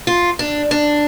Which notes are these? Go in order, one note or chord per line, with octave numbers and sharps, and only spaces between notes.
F4
D4
D4